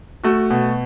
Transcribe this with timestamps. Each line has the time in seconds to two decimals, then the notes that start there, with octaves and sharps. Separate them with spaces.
0.24 A3 F#4
0.51 B2